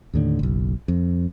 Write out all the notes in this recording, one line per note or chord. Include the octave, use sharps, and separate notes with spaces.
D#2 A2 D3
F#1 B1
F2